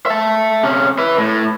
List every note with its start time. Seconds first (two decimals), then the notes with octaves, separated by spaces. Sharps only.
0.06 E5 A5
0.63 C3 C#4
0.98 B4 E5
1.18 A2